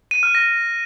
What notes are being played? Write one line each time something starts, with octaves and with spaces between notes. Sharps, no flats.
D#7
F6
A#6